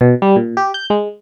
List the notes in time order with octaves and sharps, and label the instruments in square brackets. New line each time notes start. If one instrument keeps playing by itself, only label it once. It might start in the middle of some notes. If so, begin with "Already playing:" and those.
[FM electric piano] B2
G3
A#2
G4
G6
G#3